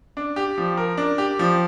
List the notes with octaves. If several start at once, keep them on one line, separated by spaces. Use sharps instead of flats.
D4
G4
F3
A#4
D4
G4
F3